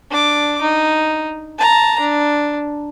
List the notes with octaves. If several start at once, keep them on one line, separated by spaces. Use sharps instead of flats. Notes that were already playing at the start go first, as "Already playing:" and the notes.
D4 D6
D#4
A5 A#5
D4